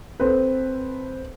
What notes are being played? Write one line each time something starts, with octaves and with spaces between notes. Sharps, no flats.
C4 A4 B4